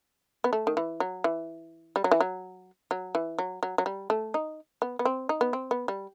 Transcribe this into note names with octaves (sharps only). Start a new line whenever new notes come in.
B3
A3
D#3
E3
F#3
E3
G3
F#3
E3
F#3
F#3
E3
F#3
F#3
F#3
G3
A3
D#4
B3
B3
C4
D#4
B3
C4
B3
G3